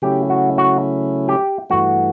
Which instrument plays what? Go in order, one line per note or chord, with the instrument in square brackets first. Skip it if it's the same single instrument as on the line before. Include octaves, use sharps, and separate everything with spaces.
[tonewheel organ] C#3 F#3 A3 C#4 E4 [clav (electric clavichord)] G4
[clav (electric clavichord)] F#4
F#4
G4
[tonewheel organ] G2 E3 A3 [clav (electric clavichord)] F#4